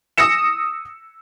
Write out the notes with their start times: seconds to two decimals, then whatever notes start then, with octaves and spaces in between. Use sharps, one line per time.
0.18 D#6 E6 A#6 C#7 E7